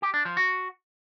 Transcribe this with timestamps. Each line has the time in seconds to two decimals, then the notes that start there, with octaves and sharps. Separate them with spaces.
0.02 G4
0.14 D4
0.25 F3
0.37 F#4